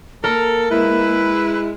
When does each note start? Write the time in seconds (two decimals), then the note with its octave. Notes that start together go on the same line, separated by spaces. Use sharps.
0.24 A#3 A4 A#4
0.71 G#3 E4 B4